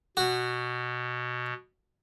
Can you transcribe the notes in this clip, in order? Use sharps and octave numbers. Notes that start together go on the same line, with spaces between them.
B2 F#4